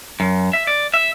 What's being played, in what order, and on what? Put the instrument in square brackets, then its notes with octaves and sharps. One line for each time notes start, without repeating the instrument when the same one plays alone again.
[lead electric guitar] F#2
E5
D5
E5